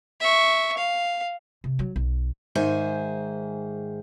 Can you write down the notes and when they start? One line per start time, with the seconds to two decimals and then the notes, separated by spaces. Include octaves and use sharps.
0.21 E5 C#6
0.77 F5
1.64 C3
1.79 F#3
1.96 B1
2.55 G#2 D#3 G#4 C5 E5 G#5